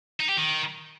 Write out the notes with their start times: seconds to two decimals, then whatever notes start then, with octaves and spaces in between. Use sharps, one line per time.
0.20 D#4
0.29 G4
0.38 D#3